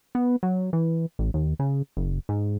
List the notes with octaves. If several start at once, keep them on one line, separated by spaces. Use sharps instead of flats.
B3
F#3
E3
A1
D#2
C#3
F#1
G#2